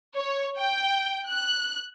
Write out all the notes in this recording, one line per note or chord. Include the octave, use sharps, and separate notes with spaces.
C#5
G5
F#6